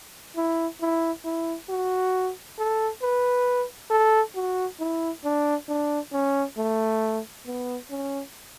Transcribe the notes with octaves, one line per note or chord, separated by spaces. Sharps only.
E4
E4
E4
F#4
A4
B4
A4
F#4
E4
D4
D4
C#4
A3
B3
C#4